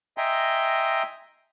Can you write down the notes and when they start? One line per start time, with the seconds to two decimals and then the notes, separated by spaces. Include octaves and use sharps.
0.18 D#5 E5 G5 G#5 A#5 C6